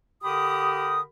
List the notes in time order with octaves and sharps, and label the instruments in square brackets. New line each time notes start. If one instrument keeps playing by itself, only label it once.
[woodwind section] D3 G4 A#4 B5 D#6